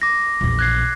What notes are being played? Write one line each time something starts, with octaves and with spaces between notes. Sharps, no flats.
D6 A#6
A#1 E2
F#6 G#6 C7